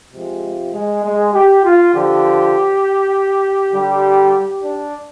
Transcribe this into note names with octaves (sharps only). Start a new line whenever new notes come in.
C3 F3 G#3
G#3
G#3
G4
F4
D3 F3 G4
D3 G3
D4